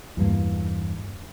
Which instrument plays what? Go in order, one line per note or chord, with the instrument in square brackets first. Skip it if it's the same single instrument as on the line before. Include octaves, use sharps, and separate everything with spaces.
[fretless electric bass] E2 G2 A#3